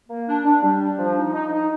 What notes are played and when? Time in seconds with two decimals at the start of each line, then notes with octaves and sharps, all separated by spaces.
0.10 A#3
0.28 D4
0.45 D4
0.63 G3
0.80 D4
0.98 F3
1.15 D#4
1.33 D#4
1.51 D#4